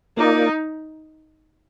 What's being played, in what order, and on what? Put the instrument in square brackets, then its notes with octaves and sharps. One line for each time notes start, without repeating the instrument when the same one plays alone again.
[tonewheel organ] A#3 F4 A#4 D5 [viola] D#4